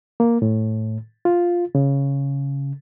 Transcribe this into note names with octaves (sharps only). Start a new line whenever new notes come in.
A#3
A2
F4
C#3